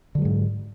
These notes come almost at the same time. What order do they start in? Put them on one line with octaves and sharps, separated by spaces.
D3 F#3 G#3 G#2